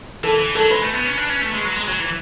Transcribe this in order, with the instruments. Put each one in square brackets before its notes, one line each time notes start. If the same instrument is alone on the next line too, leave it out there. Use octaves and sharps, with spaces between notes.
[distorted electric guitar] E3 [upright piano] A4
[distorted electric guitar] E3
[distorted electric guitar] F#3 [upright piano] A4
[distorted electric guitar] G#3 [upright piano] B4
[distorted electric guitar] A3
B3
C#4
D4
C#4
A3
G#3
F#3
G#3
F#3
E3